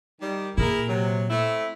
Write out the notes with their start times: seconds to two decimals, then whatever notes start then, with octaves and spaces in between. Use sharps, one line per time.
0.21 D#3 G3
0.58 A#2 E4 G#4 A#4
0.88 C3 F#3
1.29 A3 C4 E4